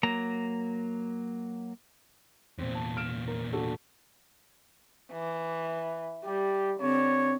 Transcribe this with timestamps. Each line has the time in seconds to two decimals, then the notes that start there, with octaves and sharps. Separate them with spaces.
0.03 F#3 A#3 A#5
2.58 E2 A#2 C4
2.75 A5
2.97 F6 D7 E7
3.28 A#4
3.53 D4 F#4 A4
5.12 E3
6.25 G3 G4
6.81 D3 C4 C#5